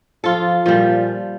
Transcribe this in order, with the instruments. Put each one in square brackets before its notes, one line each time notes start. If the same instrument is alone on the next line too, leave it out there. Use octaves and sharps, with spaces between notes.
[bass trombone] F3 [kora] F4 A4
[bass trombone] A#2 [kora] F3 G3